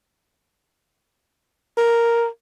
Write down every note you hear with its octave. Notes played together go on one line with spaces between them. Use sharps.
A#4